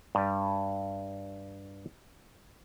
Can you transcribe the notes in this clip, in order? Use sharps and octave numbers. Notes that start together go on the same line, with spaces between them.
G2 G3